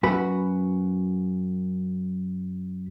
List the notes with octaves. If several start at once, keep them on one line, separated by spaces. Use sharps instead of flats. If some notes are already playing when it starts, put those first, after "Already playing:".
F#2 F#4 B4 B5